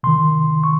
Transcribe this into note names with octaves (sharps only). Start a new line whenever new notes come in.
C3 D#3 C6
C#6